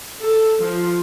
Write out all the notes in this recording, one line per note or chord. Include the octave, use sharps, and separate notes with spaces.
A4
F3